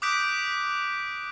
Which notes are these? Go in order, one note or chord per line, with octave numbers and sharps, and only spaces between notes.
D6 D#6 F#6 G6 B6 D7